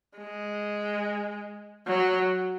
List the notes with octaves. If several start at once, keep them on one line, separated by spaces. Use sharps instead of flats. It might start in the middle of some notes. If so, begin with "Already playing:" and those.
G#3
F#3